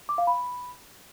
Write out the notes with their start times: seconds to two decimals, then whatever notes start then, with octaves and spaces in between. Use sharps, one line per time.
0.09 D6
0.18 F5
0.27 B5